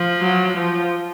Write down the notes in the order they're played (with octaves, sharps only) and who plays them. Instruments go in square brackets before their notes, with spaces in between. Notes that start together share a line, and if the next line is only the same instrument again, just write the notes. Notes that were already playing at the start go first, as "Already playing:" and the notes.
Already playing: [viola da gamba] F3
[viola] F#3
F3